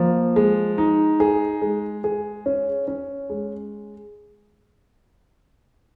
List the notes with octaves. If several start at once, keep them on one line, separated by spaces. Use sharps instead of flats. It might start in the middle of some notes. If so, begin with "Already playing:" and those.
Already playing: F3 A#3
G#3
D#4
G#4
G#3
G#4
C#4
C#4
G#3